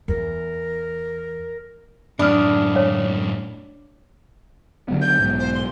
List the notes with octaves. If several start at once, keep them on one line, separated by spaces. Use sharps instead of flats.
E2 A#4
F#2 A2 D4 B5 D#6 F6
C#5 F5
D3 F#3 B3
G6
B1 G#2 B2
C5
C6